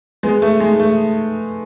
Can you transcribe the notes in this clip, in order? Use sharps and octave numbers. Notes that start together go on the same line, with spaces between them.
G#3 B3
A3
G#3
A3